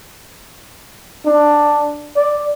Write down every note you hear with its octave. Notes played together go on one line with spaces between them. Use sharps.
D4
D5